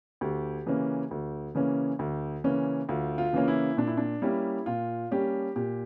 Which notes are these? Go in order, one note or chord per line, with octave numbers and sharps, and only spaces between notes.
D2 G4
C#3 E3 A#3 C#4
D2
C#3 E3 A#3 C#4
D2
C#3 E3 A#3 C#4
D2 F4
F4
C#3 E3 A#3 C#4
E4
A#2 D4
E4
D4
G3 A#3 C#4 E4
A#2 F4
G3 A#3 C#4 G4
A#2 G4